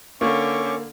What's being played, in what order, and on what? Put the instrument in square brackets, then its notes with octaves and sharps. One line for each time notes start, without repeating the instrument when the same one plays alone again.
[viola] D3 [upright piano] A#3 [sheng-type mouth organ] C#4 C#6 D6